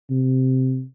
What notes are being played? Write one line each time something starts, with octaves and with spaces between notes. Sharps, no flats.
C3